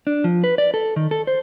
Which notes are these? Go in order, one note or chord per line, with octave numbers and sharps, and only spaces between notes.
D4
F3
B4
D5
A4
D#3
A4
C5